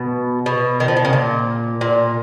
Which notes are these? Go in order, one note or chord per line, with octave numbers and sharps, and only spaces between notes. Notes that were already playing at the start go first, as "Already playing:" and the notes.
Already playing: B2
B2
D#3
F3
D#3
C#3
A#2
A#2